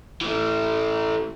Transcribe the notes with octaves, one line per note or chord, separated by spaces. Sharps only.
E3 A3